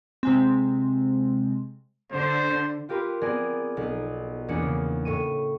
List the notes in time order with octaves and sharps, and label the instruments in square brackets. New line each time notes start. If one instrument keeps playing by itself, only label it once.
[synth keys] C3 G#3 C4
[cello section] D3 [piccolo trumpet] C5
[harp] F4 G4 A#4 B4 C6
B3 C4 G#4 A#4 D5
B1
E2 A#3 C#4 D4 C#7
C#3
A2 C#6 D#7